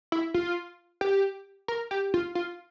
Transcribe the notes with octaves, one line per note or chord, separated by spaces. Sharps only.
E4
F4
G4
A#4
G4
F4
F4